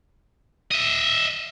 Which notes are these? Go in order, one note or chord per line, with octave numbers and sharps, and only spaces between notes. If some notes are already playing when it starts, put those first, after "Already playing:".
D#5 E5